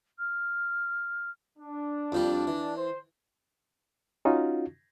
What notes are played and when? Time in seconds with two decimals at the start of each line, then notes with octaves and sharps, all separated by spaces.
0.19 F6
1.59 D4
2.12 F2 F3 G3
2.47 E3
2.77 C5
4.25 C#4 D#4 F4 F#4